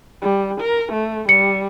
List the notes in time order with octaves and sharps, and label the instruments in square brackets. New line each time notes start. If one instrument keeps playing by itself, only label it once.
[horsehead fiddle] G3
A#4
A3
[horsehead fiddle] G3 [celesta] C#7